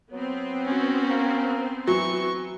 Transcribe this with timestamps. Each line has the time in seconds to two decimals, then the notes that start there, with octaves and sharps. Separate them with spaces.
0.12 F#3 B3 C4
0.65 C#4 F#4
1.10 A#3
1.88 E3 F#3 C#6